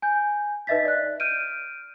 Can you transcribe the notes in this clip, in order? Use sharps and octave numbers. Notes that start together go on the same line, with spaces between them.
G#5 G6
D#4 B4 D#5 E5 A6 B6
D5 F#6
F6 G6 D7 D#7